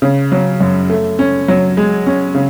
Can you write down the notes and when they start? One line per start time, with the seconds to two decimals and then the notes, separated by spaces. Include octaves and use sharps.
0.02 C#3
0.32 F#3
0.61 F#2
0.90 A3
1.19 C#4
1.48 F#3
1.77 G#3
2.07 C#4
2.35 C#3